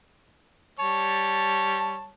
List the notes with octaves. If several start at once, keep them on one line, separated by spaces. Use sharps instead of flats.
G3 C#5 A5